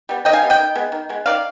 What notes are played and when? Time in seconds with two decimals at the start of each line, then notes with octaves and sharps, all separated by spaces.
0.09 G3 B3
0.25 D#3 D#5 G5
0.33 F5 G#5
0.42 G3 B3
0.50 D#5 G5
0.59 D#3
0.75 G#3 B3
0.92 D#3
1.09 G#3 B3
1.26 D#3 D5 F5